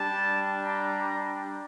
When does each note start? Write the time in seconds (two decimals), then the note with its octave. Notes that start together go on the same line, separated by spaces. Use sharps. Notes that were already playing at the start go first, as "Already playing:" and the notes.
Already playing: G3 D4 G4 A5
0.65 A#5